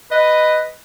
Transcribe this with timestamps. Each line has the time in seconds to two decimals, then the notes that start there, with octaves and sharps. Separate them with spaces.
0.12 B4 D#5